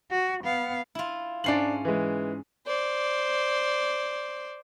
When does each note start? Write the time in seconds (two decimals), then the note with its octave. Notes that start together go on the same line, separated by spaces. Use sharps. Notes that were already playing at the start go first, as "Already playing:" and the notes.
0.11 F#4
0.44 B3 F5
0.95 E4 F4
1.44 G#2 C#4 D4 D5 C7 F#7
1.85 E3 G#3
2.66 C5 D5